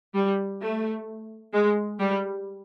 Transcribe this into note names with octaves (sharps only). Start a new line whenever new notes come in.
G3
A3
G#3
G3